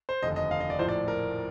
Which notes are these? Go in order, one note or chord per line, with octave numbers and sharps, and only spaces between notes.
C5
F1 D#2 D3 D#5
D#5
F5
D#5
D5
A#1 A2 F3 C5
D5
A#4